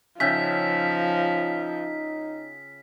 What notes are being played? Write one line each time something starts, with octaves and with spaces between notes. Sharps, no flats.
C#3 F3 D#4 E5 G5 B6